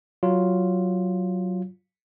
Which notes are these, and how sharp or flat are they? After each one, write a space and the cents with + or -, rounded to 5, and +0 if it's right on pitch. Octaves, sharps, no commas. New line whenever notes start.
F#3 +5 F4 +0